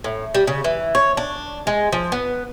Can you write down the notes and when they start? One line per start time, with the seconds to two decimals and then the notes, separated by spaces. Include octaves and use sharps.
0.04 A2
0.35 G3
0.47 C#3
0.64 E3
0.95 C#5
1.17 D4
1.67 G#3
1.93 F3
2.12 B3